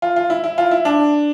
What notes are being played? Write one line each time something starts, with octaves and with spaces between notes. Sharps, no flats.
F4
F4
E4
E4
F4
E4
D4